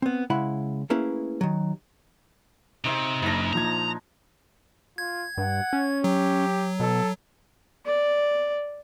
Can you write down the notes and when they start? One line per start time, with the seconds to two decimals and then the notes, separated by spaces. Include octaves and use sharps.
0.02 B3 C4
0.30 C#3 G#3 E4 F#5 B5
0.90 A3 A#3 C#4 E4 G#4 B4
1.41 D#3 F#3
2.85 C3 C4 D#4 C5 E5
3.22 F#1 F#2 D4 D#4 A#6
3.53 A#2 F3 A#5 G#6
4.98 F4 G#6
5.38 G2 F#5
5.73 C#4
6.04 F#3 G4
6.80 B2 A4
7.86 D5